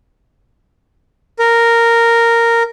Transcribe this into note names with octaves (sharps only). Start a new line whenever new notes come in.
A#4